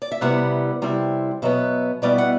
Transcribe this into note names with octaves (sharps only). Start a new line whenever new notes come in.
D5
E5
C3 G3 B3 E4 F#5
C3 G3 C4 E4
B2 F#3 B3 E5
B2 G3 B3 E4 D5
F#5